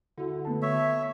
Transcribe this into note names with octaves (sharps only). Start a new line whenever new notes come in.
D3 E4 F#4 A4
A3 B3 A5
C#5 E5